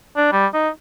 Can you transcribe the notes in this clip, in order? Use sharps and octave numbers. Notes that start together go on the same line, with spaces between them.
D4
G3
D#4